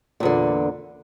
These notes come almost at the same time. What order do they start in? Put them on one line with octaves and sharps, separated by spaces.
A#2 E2 D3